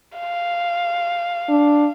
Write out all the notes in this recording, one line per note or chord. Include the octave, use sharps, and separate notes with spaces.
F5
D4